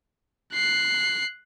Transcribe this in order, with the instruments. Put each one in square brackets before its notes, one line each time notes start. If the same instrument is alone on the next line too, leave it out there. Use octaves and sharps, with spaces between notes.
[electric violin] F#6 C7